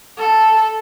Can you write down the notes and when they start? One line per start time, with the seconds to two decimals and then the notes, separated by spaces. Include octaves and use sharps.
0.18 A4